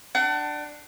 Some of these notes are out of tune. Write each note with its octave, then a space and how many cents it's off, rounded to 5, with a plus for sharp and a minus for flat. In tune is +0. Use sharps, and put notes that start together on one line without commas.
D4 +10 F#5 +40